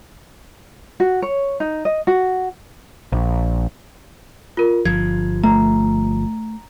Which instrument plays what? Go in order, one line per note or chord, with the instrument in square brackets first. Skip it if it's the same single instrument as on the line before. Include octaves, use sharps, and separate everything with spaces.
[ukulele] F#4
C#5
D#4
D#5
F#4
[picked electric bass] A#1
[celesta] F4 A#4
[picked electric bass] G1 F3 [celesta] G#6
[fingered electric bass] A3 [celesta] A#5